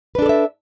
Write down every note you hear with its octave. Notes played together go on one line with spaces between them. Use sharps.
D4 A4 B4 D5 E5